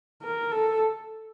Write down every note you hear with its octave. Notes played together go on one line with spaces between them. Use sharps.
A#4
A4